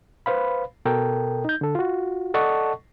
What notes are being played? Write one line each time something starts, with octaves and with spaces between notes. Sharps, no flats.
B4 C5 F5 B5
B2 A4 A#4 G5
D#4 G6
D3 A4
F4 F#4
A4 D5 D#5 F#5 A5 C#6